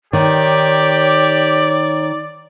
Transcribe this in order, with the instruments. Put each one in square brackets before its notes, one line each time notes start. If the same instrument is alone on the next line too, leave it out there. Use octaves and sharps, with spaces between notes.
[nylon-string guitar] D#3 [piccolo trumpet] G4 [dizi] C#5 [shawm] D5